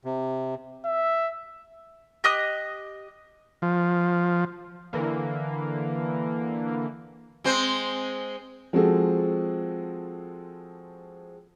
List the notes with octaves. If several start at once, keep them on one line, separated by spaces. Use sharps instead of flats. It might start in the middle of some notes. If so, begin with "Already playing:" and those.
C3
E5
G4 D#5 D#6 F#6
F3
D3 E3 A#3
G#3 C4 C5
F3 G#3 C4 F#4 G#4 A4